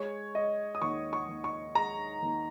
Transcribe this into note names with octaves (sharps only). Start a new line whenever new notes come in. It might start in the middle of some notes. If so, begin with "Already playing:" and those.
Already playing: G#3 C#5
G#3 D#5
D#6
D#2 C#6
C#6
D#2
C#6
G#3 A#5
D#2